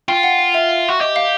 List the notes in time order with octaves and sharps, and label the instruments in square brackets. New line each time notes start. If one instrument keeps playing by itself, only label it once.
[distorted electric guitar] F4 [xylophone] G5
[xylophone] F#5
F5
E5
[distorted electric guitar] F#4
[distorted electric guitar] G4 [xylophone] D#5
[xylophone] F5